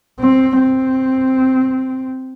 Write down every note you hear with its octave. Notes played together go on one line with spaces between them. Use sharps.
C4
C4